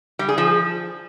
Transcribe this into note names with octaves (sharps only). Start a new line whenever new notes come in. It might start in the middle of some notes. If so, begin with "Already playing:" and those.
G3
G#4
F3